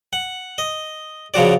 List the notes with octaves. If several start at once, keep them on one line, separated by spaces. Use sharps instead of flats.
F#5
D#5
C#3 F3 F#4 D5